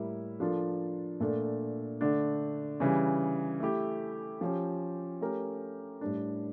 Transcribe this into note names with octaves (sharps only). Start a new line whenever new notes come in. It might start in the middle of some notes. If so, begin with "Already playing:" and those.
Already playing: A2 G3 A#3 E4
F3 A#3 D4 F4 A4
A#2 A3 D4 A4
D3 A3 D4 A4
C#3 E3 G3
A3 E4 G4
F3 C#4 G4
A3 C#4 G4 A#4
A2 G3 D4